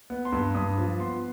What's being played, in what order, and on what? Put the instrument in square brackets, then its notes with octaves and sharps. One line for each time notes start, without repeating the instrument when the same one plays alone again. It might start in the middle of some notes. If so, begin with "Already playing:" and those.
[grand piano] B3
C6
G2
G2 D#6
F3
B3 C6